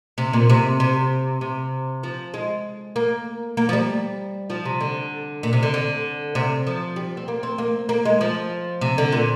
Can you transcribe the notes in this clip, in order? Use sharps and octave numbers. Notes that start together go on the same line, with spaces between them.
C3
A#2
C3
C3
C3
F3
G#3
A#3
A#3
F3
G3
F3
C3
D3
A#2
C3
D3
D3
C3
F3
G3
C4
A#3
C4
A#3
A#3
G#3
F3
C3
D3
A#2